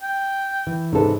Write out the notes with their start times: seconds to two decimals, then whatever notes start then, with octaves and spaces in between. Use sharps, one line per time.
0.03 G5
0.67 E3
0.93 G#2 C3 C#4 A4 B4